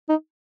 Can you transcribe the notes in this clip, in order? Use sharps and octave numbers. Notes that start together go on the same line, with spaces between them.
D#4